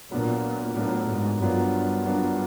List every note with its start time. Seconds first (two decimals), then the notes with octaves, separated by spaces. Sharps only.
0.11 A#2 F#3 B3 D4 F4 A#4
0.76 A2 F#3 B3 D4 F4 A#4
1.09 G#2
1.40 G2 F#3 B3 D4 F4 A#4
2.05 F#3 B3 D4 F4 A#4